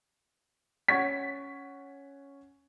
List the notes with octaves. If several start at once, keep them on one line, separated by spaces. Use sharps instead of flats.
C#4 F#5 C#6 G#6 B6